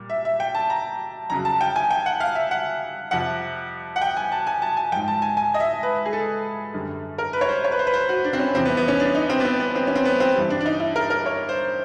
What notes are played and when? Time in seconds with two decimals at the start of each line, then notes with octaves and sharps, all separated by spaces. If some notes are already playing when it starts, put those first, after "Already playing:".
Already playing: A#2 G3
0.10 E5
0.25 E5
0.40 G5
0.55 A5
0.70 A#5
1.30 F2 C#3 F#3 A#5
1.45 A5
1.61 G5
1.76 G#5
1.91 G5
2.06 F#5
2.20 F5
2.35 E5
2.51 F#5
3.11 F2 C3 F3 F#5
3.96 F#5
4.02 G5
4.17 G#5
4.32 A5
4.47 G#5
4.62 A5
4.77 G#5
4.92 F3 G5
4.96 G#2
5.08 A5
5.22 G#5
5.37 G#5
5.54 D#5
5.60 E5
5.83 B4
6.05 G#4
6.13 A4
6.74 F#2 D3 G3
7.18 A#4
7.33 B4
7.41 C#5
7.49 C5
7.64 C#5
7.72 B4
7.79 C5
7.87 B4
7.94 C5
8.09 F#4
8.24 D4
8.33 C4
8.39 C#4
8.54 E2 C3 F3 C4
8.65 B3
8.77 B3
8.88 C#4
9.00 D4
9.15 D#4
9.30 C4
9.40 B3
9.45 C4
9.60 B3
9.75 C4
9.87 C#4
9.95 C4
10.05 B3
10.20 C4
10.35 G2 E3 G3
10.50 D4
10.61 D4
10.66 D#4
10.80 E4
10.96 A#4
11.10 A#4
11.26 C#5
11.49 C5